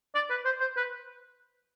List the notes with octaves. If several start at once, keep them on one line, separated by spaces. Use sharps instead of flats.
D5
B4
C5
C5
B4